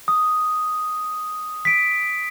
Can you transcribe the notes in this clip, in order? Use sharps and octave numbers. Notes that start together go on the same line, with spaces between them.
D#6
B6 D7